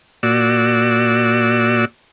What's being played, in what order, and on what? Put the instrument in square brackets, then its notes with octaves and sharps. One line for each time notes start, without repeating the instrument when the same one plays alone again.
[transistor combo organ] A#2 F#4 D5 E6